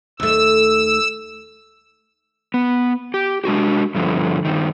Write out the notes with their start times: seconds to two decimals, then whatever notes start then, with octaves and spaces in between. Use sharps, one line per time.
0.20 D#2 A3 E6
2.54 B3
3.14 G4
3.44 G#3 D4 F#4 G4
3.95 G2 D3 F3
4.45 G2 D#3